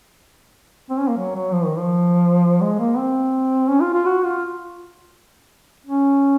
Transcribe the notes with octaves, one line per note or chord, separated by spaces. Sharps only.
C4
C#4
A#3
F#3
F#3
F3
D#3
F3
G#3
A#3
C4
C#4
F4
F4
F#4
F4
C#4